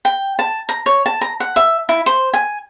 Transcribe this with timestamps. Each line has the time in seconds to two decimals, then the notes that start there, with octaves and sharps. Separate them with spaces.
0.05 G5
0.39 A5
0.69 A#5
0.86 C#5
1.06 A5
1.21 A#5
1.40 F#5
1.56 E5
1.89 E4
2.06 C5
2.34 G#5